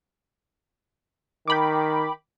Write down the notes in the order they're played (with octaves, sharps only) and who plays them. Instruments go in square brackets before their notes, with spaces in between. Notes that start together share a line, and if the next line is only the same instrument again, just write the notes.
[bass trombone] D#3 [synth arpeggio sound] G5 B5 D6